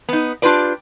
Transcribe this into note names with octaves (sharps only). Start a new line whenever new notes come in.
B3 D#4
D4 F4 G4 B4 D5